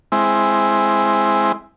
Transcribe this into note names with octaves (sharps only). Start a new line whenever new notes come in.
G#3 C4 E4